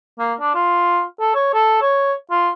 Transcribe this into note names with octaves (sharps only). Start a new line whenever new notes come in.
A#3
D4
F4
A4
C#5
A4
C#5
F4